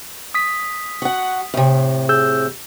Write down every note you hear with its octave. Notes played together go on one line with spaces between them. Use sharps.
D#6 B6
F#4 F#5
A2 C3
G#4 E6 G6